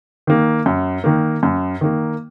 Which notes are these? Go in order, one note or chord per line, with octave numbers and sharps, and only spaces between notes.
D#3 A#3
F#2
D#3 A#3
F#2
D#3 A#3